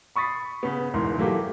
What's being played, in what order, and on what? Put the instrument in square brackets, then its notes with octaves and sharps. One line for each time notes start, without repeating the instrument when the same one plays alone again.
[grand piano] B5 C#6 D#6 A6 B6 C7
C#3 B3
E1 G#2 E3 A#4 C6
E3 F#3 A3 A#3 G4